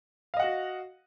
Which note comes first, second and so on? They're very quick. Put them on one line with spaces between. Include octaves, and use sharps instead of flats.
F5 D#5 F#5 F#4